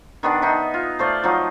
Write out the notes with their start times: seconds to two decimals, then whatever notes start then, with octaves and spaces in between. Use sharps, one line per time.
0.23 D#3 B3 D4
0.42 D#4 E5
0.74 F4
0.99 A3 C5 D5 F5
1.23 F3 F#3 D#4